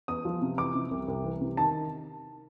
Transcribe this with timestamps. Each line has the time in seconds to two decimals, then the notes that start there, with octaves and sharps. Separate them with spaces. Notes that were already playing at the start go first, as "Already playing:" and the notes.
0.08 E2 D#6
0.25 F3
0.42 C3
0.58 E3 D6
0.75 C3
0.91 C2
1.08 C2
1.24 E3
1.41 C3
1.57 D#3 A5